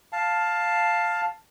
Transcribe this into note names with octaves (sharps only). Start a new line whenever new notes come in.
F5 A5